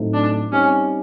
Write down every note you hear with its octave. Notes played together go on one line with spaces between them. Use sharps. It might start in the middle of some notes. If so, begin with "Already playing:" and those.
Already playing: A2 F#3 A3 C4 D#4
D4
G3 C4 C#4 D#4